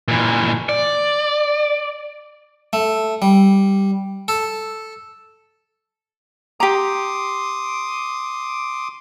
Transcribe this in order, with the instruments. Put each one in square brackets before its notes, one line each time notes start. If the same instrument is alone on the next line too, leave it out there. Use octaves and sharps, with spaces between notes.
[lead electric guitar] A#2 E3
D5
[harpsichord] A3
G3
A4
[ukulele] G4 A#5 [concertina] C6 D6 D#6